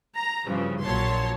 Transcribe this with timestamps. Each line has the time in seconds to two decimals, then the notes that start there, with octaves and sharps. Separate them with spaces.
0.14 A#5
0.47 G2 C#3 E3 F3
0.82 A#1 A#2 F#3 C#5 A5 C6